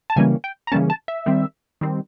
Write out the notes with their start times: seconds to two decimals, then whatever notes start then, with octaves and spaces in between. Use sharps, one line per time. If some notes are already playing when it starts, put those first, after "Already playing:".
0.10 A5
0.16 C#3 E3 G3 A#3 C#4 G#5
0.44 G5
0.67 A#5
0.72 C#3 E3 G3 A#3 C#4 A5
0.90 A5
1.08 E5
1.26 D#3 G3 C4
1.81 D#3 G3 C4